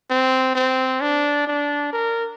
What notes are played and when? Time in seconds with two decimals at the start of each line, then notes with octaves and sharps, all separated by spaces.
0.11 C4
0.55 C4
1.01 D4
1.47 D4
1.93 A#4